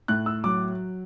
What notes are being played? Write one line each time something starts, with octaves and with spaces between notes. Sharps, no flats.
A2 F#6
E6
F#3 D6